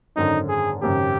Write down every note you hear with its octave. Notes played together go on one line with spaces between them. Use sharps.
G#1 F#2 D3 D#4
G#4
G#1 F#2 C#3 G4